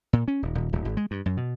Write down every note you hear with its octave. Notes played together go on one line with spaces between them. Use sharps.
A#2
C#4
D#1
D#1
D1
G#1
G#3
G2
F#2
B2